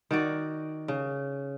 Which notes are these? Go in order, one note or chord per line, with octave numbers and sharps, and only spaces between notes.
D#3 F#4 D5
C#3